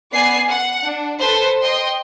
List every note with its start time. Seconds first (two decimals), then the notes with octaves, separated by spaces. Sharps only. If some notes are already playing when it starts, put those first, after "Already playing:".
0.13 B3 D5 G#5 C7
0.49 F#5
0.83 D4
1.19 A4 B4 C5
1.62 D#5 G5 C6